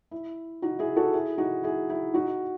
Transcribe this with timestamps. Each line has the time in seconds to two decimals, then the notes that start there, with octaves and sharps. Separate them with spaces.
0.11 E4
0.62 D#4 F#4
0.79 E4 G#4
0.96 F#4 A4
1.13 E4 G#4
1.38 D#4 F#4
1.63 E4 G#4
1.90 E4
2.14 D#4 F#4